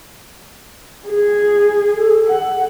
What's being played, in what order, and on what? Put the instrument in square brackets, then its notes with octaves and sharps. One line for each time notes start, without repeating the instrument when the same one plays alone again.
[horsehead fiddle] G#4
[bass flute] A4
[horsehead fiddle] F#5